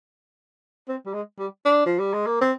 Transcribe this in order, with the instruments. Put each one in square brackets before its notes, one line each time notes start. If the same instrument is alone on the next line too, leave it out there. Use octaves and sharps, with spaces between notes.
[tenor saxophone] C4
G3
G#3
G3
D4
F3
G3
G#3
A#3
C4